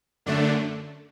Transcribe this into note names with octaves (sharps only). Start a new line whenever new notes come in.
F#2 D3 A3 D4